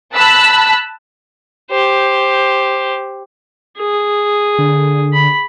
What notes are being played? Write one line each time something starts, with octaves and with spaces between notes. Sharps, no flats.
A5 B5 E6 F#6 B6
G4 C5
G#4
D3
B5